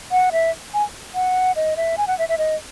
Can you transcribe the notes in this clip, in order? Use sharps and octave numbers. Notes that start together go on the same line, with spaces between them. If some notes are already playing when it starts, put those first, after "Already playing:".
F#5
E5
G#5
F#5
D#5
E5
G#5
F#5
E5
E5
D#5